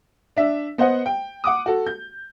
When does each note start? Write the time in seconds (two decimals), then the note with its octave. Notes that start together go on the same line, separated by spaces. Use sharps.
0.37 D4 E5
0.78 B3 C5 D#5 F#5
1.06 G5
1.44 F#5 D6 D#6
1.66 F#4 A4
1.87 G6